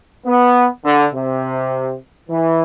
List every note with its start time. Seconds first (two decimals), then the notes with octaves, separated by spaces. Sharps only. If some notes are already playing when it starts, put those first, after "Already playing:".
0.26 B3
0.84 D3
1.13 C3
2.29 E3